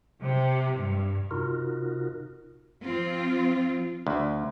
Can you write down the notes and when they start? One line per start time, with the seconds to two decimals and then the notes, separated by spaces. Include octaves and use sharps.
0.22 C3
0.76 G2
1.31 C3 D#4 F4 F#4 A#4
2.84 F3 C4 F4
4.07 D2